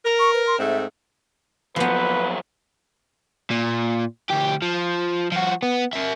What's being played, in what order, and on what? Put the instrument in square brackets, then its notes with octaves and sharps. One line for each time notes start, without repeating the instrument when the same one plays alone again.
[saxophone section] A#4
[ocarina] C#6
B4
C6
[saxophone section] G#2 A3 C4 [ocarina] E5
[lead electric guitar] A#2 F#3 [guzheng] F3 B3 [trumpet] B4
[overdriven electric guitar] A#2
D2 G4
F3
F3 F#4
B3
A#4 E5